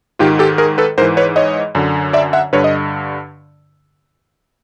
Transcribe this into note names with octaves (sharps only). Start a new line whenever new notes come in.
G#2 D#3 F4 G4
G4 A4
G#4 A#4
A4 B4
G#2 E3 A#4 C5
B4 C#5
C#5 D#5
F#2 D3
D5 E5
E5 F#5
G2 D3 B4 C#5
D#5